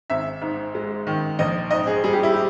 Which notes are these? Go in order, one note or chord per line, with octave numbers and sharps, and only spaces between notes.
G#1 E5
G#2
G#3
D#3
A#1 D#5
G#2 D#5
G#4
G3 G#4
G4
E4
G4